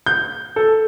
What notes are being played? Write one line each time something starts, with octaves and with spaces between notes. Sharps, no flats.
G6
A4